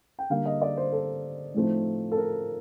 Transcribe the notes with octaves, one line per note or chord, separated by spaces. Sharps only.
G5
D3 G3 A#3 F5
D#5
D5
C5
A4
A2 F3 A3 C4 D#4
A4
A#4